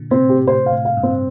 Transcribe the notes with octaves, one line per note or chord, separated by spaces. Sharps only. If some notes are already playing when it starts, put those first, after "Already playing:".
Already playing: A#2 D3
A2 C3 C4
G4
A2 C5
F5
A2
F5
G2
C4